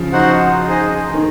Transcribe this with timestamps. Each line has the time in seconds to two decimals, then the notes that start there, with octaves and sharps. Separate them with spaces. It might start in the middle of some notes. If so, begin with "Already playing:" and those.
Already playing: C#3 F3
0.13 D#4 F#4 C5 F#5
0.67 D#4 G#4 C5 D#5
1.14 D#3